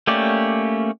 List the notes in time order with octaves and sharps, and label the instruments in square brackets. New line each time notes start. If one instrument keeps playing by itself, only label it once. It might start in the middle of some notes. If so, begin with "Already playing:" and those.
[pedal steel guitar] A3 A#3 C#4 G4 D5